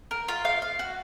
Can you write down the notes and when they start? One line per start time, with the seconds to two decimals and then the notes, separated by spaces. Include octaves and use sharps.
0.11 A#4
0.28 F4
0.45 F5
0.62 F5
0.79 F#4